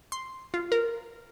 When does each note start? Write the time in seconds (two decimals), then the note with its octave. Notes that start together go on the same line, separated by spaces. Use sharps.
0.12 C6
0.54 F4
0.72 A#4